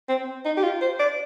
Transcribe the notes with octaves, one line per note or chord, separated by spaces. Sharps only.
C4
D#4
G4
F4
C5
D5